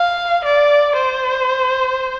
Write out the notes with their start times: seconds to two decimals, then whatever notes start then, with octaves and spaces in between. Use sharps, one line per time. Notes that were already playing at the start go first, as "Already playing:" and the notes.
Already playing: F5
0.45 D5
0.97 C5